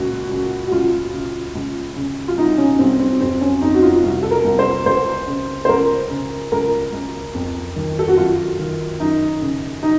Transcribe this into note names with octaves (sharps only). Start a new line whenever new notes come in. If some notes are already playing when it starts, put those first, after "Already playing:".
Already playing: C#2 A#2 F#4
C#2
F#4
C#2 F4
C#3
C#2
C#3
F4
C2 D#4
C#4
C2 C4
C4
F2 C4
C#4
F2 D#4
F#4
F4
C2
A4
A#4
C2
C5
C#2 C5
C#3
C5
C#2 A#4
C#3
C#2 A#4
C#2
F2
D#3
A4
F#4
F#2 F4
D#3
F#2 D#4
C#3
D#4